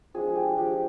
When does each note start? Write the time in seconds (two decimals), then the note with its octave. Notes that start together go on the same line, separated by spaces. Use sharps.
0.14 F3 G#3 D4 G#4
0.35 G4
0.57 F3 G#3 D4 G4